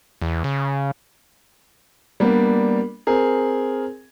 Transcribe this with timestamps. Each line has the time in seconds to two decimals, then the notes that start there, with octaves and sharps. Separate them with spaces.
0.22 E2
0.44 C#3
2.20 G3 A#3 B3 D4
3.07 C4 G#4 A#4